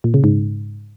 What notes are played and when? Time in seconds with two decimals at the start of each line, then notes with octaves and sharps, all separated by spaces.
0.04 A#2
0.14 C#3
0.24 G#2